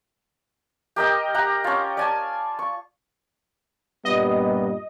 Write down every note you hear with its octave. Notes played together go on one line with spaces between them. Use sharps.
G4 A#4 D#5 G5
G4 F#5 A#5
C#4 F4
D5 G#5 A5
C#6
G2 A#2 G3 B3 D#5